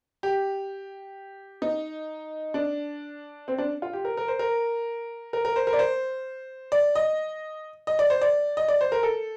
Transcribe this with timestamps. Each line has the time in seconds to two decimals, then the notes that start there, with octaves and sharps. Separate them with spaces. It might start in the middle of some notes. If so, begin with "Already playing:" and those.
0.23 G4
1.62 D#4
2.54 D4
3.48 C4
3.58 D4
3.82 F4
3.93 G4
4.05 A#4
4.17 A#4
4.28 C5
4.39 A#4
5.33 A#4
5.45 A#4
5.56 C5
5.67 A#4
5.73 D5
5.79 C5
6.72 D5
6.95 D#5
7.87 D#5
7.99 D5
8.10 C5
8.22 D5
8.57 D#5
8.68 D5
8.81 C5
8.92 A#4
9.03 A4